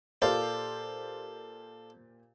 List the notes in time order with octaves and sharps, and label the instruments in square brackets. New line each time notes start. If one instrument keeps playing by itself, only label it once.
[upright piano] A#2 G4 C5 [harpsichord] A4 D5 F5